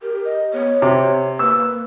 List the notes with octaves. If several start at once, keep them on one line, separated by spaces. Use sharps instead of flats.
G4 A#4
D#5
B3 C#5
C3 C5
A#3 B4 E6